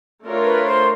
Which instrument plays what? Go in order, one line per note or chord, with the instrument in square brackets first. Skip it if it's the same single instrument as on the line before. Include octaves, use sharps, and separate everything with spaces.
[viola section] A3 D4 F4 A#4 C#5
[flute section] B4
C5